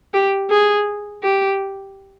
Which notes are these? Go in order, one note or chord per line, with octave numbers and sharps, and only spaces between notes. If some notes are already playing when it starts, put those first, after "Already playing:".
G4
G#4
G4